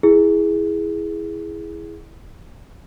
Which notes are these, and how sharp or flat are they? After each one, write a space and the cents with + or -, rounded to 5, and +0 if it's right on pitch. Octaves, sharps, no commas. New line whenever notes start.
E4 +0 G#4 +0